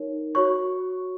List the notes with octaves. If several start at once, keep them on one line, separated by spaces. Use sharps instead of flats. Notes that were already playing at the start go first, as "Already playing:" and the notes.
Already playing: D#4 A#4 C#5
F#4 C#5 C#6